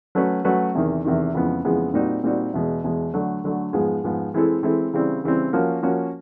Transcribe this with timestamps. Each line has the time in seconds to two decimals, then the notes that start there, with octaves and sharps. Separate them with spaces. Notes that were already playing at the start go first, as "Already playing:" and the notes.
0.15 F#3 A3 C#4 F#4 B4
0.45 F#3 A3 C#4 F#4 B4
0.75 E2 C3 D#3
1.04 E2 C3 D#3
1.34 F2 C#3 E3 G#3 B3
1.64 F2 C#3 E3 G#3 B3
1.94 A#2 G3 C4 D#4 F#4
2.24 A#2 G3 C4 D#4 F#4
2.54 E2 B2 G#3
2.84 E2 B2 G#3
3.14 D3 F#3 A3
3.44 D3 F#3 A3
3.73 G#2 F3 G#3 B3
4.04 G#2 F3 G#3 B3
4.34 E3 G#3 C4 E4 A4
4.63 E3 G#3 C4 E4 A4
4.93 C#3 E3 G3 C4
5.24 C#3 E3 G3 C4
5.53 F3 A#3 C#4 F#4
5.83 F3 A#3 C#4 F#4